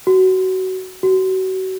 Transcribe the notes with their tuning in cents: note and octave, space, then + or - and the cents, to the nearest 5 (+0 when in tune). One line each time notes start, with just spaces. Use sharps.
F#4 +20
F#4 +30